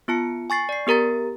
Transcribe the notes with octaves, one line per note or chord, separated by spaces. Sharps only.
B3 F4 A5 C#7
G#5 C#6 A6 C7
D5 C7
B3 G4 A#4 A#5 A6